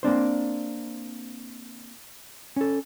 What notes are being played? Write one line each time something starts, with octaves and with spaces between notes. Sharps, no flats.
A#3 C4 D4 C5
C#4 A4